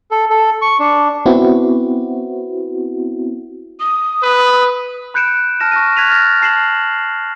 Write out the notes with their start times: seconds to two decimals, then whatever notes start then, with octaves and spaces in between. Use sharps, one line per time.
0.11 A4
0.30 A4
0.62 C#6
0.79 D4
1.26 B3 C4 E4 F#4
3.80 D#6
4.22 B4
5.14 B5 F#6 G6 C#7 D7 E7
5.60 A5 F6 A#6 E7
5.72 C#6 A#6 D#7
5.96 F#6 G#6 A#6 B6 D#7 F7
6.10 F6 A6 A#6
6.41 A5 C7 E7 F#7